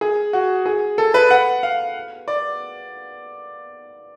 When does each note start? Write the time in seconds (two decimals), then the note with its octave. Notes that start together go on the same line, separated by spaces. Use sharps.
0.01 G#4
0.33 F#4
0.66 G#4
0.98 A4
1.14 B4
1.30 F#5
1.63 F5
2.28 D5